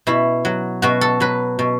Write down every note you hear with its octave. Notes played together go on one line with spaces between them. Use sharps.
B2 E4
F#3
B2 F#4
A4
F#3 B4
B2